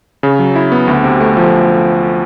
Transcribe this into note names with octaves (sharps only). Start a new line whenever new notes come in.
C#3
F#3
E4
B3
D2
C3
A3
F3